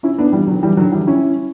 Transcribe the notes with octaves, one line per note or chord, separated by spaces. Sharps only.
C#4 E4
B3 D4
E3 G3
D3 F#3
E3 G3
D3 F#3
E3 G3
C#4 E4